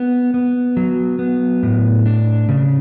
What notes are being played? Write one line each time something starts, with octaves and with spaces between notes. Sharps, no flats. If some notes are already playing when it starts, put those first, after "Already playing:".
Already playing: B3
B3
F#3
B3
A2
D4
C#3